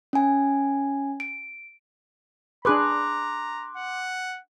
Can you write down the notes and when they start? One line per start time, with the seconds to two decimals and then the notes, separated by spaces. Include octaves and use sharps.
0.13 C#4 G#5
1.20 D7
2.65 D4 G#4 B4 A#5 C6 D6 F#6
3.77 F#5